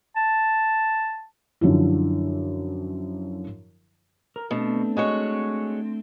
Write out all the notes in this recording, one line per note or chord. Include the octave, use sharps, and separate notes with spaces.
A5
F#2 D3 F3 E4
A#4
B2 A3 C4 D4
G#3 F#4 C#5